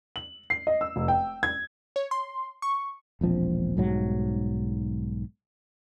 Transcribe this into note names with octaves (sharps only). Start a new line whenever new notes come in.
F#7
C7
D#5
E6
F1
G5
G#6
C#5
C6
C#6
E1 A#1 F3 C4
B1 G#2 F#3 G3